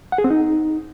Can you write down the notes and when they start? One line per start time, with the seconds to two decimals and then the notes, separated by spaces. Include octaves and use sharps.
0.12 F#5
0.18 G#4
0.24 C4
0.30 D#4